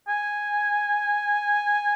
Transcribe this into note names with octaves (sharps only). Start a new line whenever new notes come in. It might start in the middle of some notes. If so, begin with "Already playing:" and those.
G#5